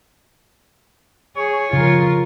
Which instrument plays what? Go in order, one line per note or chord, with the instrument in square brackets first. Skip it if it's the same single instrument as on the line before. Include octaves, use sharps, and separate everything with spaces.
[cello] G#4 [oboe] C#5
[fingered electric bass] C#3 F3 [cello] F4 A#4